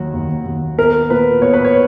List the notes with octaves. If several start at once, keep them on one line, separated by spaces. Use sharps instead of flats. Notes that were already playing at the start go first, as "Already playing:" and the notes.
Already playing: D#2 F#3 F#4
D#2
D#2
B3 A#4
A#2 B4
B3 C#5
B4
C#5